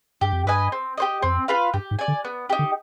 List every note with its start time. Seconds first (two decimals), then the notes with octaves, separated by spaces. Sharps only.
0.21 G2 G4
0.33 F2
0.45 G2 B4 D#5 G#5
0.72 C4
0.97 G4 C5 D#5
1.22 F2 C4
1.48 F4 B4 F5
1.74 G2 G4
1.91 G#2
1.99 D5 G#5
2.08 D3
2.25 B3
2.50 D#4 G4
2.59 D3